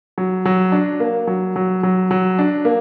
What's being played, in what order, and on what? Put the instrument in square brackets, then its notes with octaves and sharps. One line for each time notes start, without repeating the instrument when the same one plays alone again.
[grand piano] F#3
F#3
D4
A#3
F#3
F#3
F#3
F#3
D4
A#3